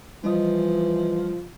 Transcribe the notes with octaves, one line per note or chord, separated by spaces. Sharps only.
E3 F3 G3 E4 D#5